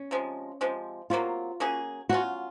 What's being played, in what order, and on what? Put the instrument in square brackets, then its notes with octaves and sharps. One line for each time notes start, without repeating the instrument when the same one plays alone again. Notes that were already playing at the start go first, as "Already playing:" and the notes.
Already playing: [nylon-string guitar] C#4
[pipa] C3 F3 G#3
C3 F3 G#3
[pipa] C3 F#3 A#3 [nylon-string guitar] F4
[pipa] F#3 A#3 C#4 G#4
[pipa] F#3 C#4 F4 [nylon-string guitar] F#4